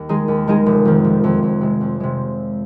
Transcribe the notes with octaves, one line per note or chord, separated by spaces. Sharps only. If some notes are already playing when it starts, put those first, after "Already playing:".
Already playing: D#2
D#3 G#3 D#4 G#4
D#2
D#3 G#3 D#4 G#4
F1
F2 D#3
F1
F2 D#3
F2
C3 G#3
F2
C3 G#3